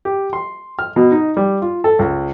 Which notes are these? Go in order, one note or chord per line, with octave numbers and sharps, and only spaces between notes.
G4
C6
F6
B2
D#4
G3
F4
A4
C#2